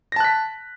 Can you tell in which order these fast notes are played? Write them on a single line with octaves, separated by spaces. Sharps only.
A#6 A5 F#6 B6